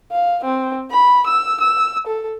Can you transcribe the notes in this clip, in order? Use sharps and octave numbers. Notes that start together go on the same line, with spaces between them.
F5
C4
B5
E6
E6
A4